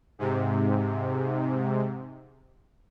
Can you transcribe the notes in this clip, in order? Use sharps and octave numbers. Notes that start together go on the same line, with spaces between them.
G#2 C3